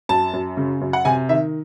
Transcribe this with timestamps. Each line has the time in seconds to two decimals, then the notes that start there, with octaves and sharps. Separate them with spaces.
0.09 F#2 A5
0.33 F#2
0.57 C#3
0.81 F#2
0.93 F#5
1.05 C3 G#5
1.29 D#3 E5